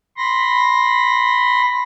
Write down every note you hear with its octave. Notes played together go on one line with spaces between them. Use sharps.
B5 C6 A#6